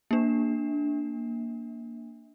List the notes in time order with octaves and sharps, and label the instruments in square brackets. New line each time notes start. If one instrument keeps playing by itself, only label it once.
[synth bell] A#3 D4